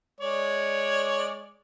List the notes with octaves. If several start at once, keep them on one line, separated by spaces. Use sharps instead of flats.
G#3 C#5 D5